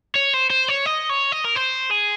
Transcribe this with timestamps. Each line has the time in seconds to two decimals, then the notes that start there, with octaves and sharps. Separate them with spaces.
0.16 C#5
0.34 C5
0.50 C5
0.68 C#5
0.86 D#5
1.09 C#5
1.32 D#5
1.45 A#4
1.56 C5
1.91 G#4